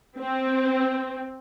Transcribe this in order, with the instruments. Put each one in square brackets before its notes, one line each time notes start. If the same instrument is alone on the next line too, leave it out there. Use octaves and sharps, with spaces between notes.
[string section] C4